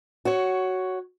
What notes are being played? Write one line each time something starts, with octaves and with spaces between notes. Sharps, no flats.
F#4 C#5